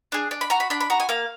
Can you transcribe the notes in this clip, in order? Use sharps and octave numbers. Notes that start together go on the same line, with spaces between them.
D4 G#4
D4
B5
F#4 A#5
B5
D4 B5
B5
F#4 A#5
G#5
A#3 F5